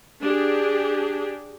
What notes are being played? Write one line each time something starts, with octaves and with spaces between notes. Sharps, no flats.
D4 G4 G#4